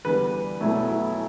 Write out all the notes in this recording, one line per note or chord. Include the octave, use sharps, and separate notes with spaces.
E2 D3 G3 B4
B1 B2 F#3 A3 E4
E4